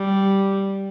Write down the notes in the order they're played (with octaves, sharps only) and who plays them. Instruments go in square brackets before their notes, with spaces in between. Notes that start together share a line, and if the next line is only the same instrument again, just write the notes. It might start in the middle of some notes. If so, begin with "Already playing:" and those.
Already playing: [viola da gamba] G3